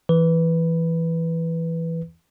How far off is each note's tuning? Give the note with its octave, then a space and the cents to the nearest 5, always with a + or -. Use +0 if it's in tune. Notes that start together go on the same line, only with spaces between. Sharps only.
E3 +0 B4 +0